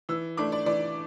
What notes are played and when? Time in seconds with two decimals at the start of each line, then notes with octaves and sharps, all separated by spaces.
0.09 E3 E6
0.37 A3 D4 D6
0.52 D5
0.66 E3 D5